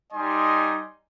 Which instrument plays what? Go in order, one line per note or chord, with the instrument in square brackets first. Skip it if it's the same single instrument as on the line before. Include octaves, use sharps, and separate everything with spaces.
[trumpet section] G3 D#4 D#5 G#5 C6